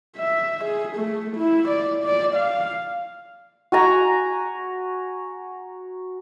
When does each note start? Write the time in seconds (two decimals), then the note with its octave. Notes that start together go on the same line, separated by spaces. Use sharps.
0.16 E5
0.64 G#4
0.97 A3
1.36 E4
1.68 D5
2.04 D5
2.36 F5
3.72 F#4 G#5 A#5